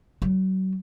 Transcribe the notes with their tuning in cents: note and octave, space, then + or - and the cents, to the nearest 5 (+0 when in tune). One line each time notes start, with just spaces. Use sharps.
F#3 +35